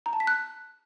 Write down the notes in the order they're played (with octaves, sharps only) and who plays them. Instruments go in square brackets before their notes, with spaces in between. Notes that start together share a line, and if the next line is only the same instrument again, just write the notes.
[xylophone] A#5
A5
B6
F#6